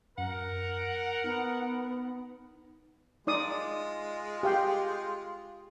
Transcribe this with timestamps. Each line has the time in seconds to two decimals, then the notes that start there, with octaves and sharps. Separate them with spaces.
0.18 F#2 A#4 F#5
1.24 B3 D#4
3.27 G#3 D#4 F4 D5 D#6
4.43 G4 F5 G5